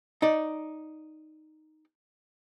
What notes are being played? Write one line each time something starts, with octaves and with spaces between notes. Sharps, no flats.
D#4 D5